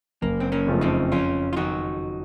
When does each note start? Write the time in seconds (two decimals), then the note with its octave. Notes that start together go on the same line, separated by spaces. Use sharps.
0.22 F#1 A#3
0.40 C4
0.52 A#3 C#4
0.67 F2 C#3 F3 A3
0.81 C4 D#4
1.12 F2 C#4 F4
1.53 F4
1.57 D#3 F#3 D#4 F#4